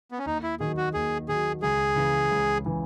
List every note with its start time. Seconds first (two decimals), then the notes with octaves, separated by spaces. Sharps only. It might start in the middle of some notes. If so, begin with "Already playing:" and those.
0.12 B3
0.19 C#4
0.26 D#2 D#4
0.43 E4
0.60 D#3 F#3 G#4
0.77 F#4
0.94 D#2 G#4
1.28 D#3 F#3 G#4
1.62 C#2 G#4
1.96 C#3 E3
2.31 C#2
2.65 C#3 E3